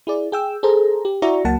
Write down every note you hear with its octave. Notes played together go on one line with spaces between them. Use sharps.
E4 G#4 D5
G#4 G5 E6
G#4 A4 C5 A#5
G4
E4 F#4 D5 E5 A#5 C#6
C#2 F#3 A#3 F#5 A5